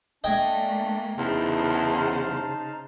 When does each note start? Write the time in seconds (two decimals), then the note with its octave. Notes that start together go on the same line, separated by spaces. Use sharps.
0.24 A3 A#3 D4 D#5 G5 G#5
1.18 E2 C#3 D#4 C5 A5 F6